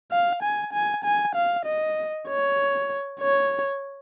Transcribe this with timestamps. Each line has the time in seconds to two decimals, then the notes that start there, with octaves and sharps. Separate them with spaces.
0.12 F5
0.43 G#5
0.73 G#5
1.04 G#5
1.35 F5
1.66 D#5
2.28 C#5
3.20 C#5